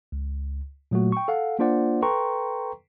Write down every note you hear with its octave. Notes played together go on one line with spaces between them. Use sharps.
C#2
A#2 F#3 A3 F#4
G5 C#6
A4 F5 F#5
A#3 D4 F4 C5 D5 F#5
A4 B4 G5 A#5 C6 C#6